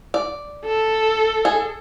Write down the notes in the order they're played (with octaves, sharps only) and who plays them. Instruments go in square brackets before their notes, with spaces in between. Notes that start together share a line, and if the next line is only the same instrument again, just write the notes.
[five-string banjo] D5
[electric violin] A4
[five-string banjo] G#4